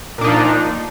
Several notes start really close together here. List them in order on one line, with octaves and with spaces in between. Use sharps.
A#2 D4 D#4 F3